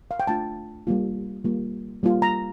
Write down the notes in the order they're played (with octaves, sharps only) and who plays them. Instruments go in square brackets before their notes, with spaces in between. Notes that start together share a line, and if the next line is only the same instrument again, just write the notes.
[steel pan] F5
G5
A3 D4 F4 A5
G3 A#3 F4
G3 A#3 F4
G3 A#3 F4
A#5